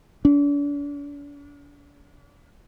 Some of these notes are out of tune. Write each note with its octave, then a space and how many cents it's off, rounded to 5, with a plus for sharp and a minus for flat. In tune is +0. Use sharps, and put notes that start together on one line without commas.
D4 -40